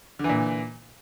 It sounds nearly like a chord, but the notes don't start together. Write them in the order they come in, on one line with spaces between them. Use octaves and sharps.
D3 E3 A#2